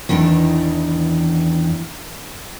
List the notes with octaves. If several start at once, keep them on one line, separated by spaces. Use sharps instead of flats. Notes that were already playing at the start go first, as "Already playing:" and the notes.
E2 D#3 E3 D4 D#4